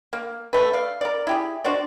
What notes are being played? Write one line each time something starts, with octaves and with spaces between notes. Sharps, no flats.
A#3
A3 B4
D5 F5
A#4 D5
E4 G4 G#4
D4 F#4 C5 D5